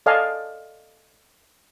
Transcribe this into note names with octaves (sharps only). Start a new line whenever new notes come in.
A4 D5 D#5 F5 G#5 A5